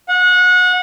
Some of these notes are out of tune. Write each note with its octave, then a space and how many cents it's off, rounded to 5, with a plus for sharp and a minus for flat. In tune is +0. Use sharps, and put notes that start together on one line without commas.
F#5 -30